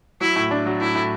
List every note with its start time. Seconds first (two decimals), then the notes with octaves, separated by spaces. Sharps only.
0.21 F#3 E4
0.36 A2
0.51 D4
0.66 F#3
0.81 A2 E4
0.95 A2